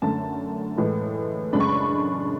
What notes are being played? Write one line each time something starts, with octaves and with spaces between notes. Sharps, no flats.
F#2 D3 A3 A5
A2 E3 G#3
F#2 C#3 G#3 D4 B5
C#6
B5